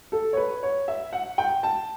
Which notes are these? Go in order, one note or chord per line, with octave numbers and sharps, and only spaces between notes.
A4
C#5
B4
C#5
E5
F#5
G5
A5